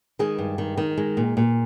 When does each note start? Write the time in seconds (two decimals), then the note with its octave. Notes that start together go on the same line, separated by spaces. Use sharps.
0.19 D#3 G#3 G#4
0.38 G2
0.58 D#3
0.77 D#3
0.98 G#3
1.17 A#2
1.37 A#2